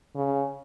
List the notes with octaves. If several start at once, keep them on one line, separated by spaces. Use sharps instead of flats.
C#3